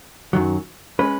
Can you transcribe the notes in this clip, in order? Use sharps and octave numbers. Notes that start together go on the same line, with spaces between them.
F#2 D#3 F#3
G#3 C#4 B4